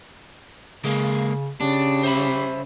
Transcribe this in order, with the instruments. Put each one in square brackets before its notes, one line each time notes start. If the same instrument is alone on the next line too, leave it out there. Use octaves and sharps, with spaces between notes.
[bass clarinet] C#3 [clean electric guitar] G#3 A#3
[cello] C#3 [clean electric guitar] D4 [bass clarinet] G4
[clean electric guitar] C5 E5 B5